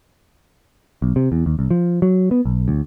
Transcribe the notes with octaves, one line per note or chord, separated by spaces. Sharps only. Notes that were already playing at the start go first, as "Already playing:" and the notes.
B1
C3
E2
D#2
C2
F3
F#3
B3
B1
D2